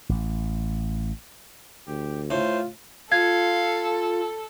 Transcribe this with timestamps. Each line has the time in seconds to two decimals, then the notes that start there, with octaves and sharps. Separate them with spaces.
0.09 A1
1.87 D2 G4
2.30 A2 F4 C5
3.12 F4 A4 F5 G#6